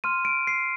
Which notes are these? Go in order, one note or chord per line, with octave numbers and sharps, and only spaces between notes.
C6 F6 D#7
D7
C7